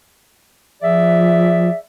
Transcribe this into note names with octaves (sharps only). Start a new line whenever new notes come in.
F3 G#4 D5 E5